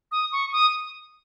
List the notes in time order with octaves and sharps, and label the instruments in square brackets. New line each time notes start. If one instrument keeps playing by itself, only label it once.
[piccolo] D#6
C#6
D#6